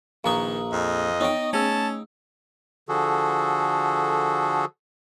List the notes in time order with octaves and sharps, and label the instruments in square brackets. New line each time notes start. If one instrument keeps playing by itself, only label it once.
[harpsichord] A#1 B4 C#6 [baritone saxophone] D#3 [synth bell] F5 A#5 D#6
[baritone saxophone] F2 [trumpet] D#5
[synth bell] B3 C#5 C#6 [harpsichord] D#4 G5
[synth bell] A3 G#4 E6 [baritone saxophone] C#4 [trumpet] A5
[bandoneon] D3 F3 F#4 G#4 A4